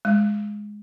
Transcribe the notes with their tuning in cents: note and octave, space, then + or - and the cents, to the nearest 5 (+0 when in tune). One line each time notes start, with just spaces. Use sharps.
G#3 +5